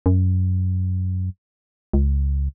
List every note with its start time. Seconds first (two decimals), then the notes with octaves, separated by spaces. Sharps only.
0.06 F#2
1.93 C#2